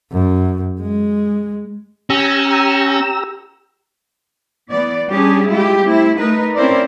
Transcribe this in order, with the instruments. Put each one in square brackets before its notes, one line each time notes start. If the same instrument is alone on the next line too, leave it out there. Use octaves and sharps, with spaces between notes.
[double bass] F#2
G#3
[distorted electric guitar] C#4 [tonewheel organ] G4 A#5 E6
[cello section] E3 B3 D5
G3 C#4 D4 G4 G#4
G3 G#3 E4 F4 G4
A3 C4 E4
A3 D#4 A#4 B4
C4 C#4 E4 A#4 C5 D5